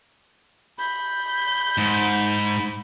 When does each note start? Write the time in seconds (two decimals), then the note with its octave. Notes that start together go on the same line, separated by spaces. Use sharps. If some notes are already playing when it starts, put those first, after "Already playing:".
0.79 B5 G6
1.78 G#2